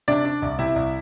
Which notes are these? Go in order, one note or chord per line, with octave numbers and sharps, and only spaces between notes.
C3 D4 D5
D4
C2
C3 E4 E5
C2